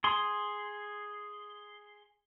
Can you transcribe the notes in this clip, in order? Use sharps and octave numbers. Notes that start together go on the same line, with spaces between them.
G#4 C6